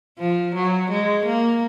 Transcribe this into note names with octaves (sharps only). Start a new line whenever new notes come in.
F3
F#3
G#3
A#3